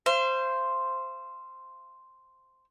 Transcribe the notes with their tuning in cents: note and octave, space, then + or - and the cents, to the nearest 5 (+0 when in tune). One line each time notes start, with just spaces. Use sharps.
C5 +0 F5 -40